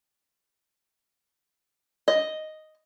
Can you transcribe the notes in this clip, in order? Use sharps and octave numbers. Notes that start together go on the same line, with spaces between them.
D#5